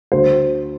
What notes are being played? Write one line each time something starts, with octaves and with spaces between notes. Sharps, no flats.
D2 C5